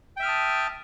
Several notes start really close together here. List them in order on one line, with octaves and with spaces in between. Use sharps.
G5 E5 F6 D#6 A5